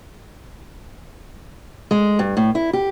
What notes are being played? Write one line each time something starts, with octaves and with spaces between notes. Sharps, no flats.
G#3
G2
A2
E4
G4